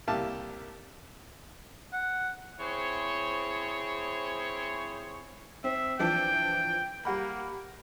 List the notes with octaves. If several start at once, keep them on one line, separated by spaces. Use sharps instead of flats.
C2 A#3 E4 G4 F5 A5
F#5
C4 E4 G#4 C5 C#5
C4 E5
E3 F3 D4 G5
G3 A#3 F#5 B5